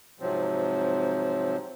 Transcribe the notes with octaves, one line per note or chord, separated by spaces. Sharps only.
G#2 C3 F3 F#3 C4